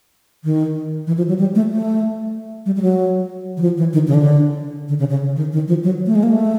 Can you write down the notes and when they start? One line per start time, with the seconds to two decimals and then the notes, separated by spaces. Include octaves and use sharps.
0.44 D#3
1.07 E3
1.17 F3
1.28 F#3
1.39 G3
1.55 A3
1.71 A3
2.66 G3
2.76 G3
2.82 F#3
3.57 E3
3.62 F3
3.77 E3
3.93 D#3
4.07 C#3
4.14 D3
4.89 D3
4.99 C#3
5.10 C#3
5.36 D#3
5.52 D#3
5.68 F3
5.84 F#3
6.06 A3
6.15 G#3
6.23 A#3
6.32 A3